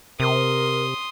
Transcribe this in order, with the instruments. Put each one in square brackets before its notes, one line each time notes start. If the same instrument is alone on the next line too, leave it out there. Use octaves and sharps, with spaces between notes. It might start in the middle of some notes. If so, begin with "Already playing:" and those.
[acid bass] C3 [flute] A#4 [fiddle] C6 D#6